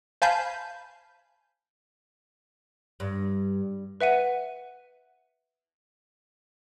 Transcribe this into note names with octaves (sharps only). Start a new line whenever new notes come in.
C5 F5 G#5 A5 B5 G6
G2
B4 E5 F#5 D#7